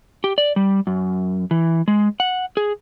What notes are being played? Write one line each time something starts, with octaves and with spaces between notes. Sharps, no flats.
G4
D5
G3
F#2
E3
G#3
F#5
G#4